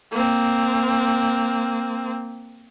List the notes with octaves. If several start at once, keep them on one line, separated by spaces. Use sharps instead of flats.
A#3 C4